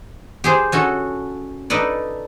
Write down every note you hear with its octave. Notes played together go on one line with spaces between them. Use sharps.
G4 G#4 C5
C#4 F#4 A4
D#4 A4 B4 D5